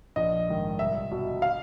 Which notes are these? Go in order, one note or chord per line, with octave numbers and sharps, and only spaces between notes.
A#1 D#5
G#2 D#3
C2 E5
B2
F5